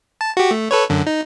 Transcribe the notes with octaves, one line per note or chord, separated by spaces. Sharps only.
A5
F#4 G4
A3
A4 B4 C#5
F#2 D3
D#4